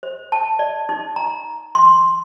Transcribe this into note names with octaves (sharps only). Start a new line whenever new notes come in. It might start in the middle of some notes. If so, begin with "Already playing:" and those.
C5
A5
D5
D#4
A#5
C6